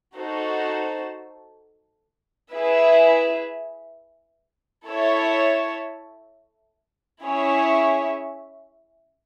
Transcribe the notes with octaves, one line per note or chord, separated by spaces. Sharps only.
D#4 F#4 A4 C5
E4 G#4 B4 E5
E4 A4 C#5 E5
C#4 E4 G#4 C#5 E5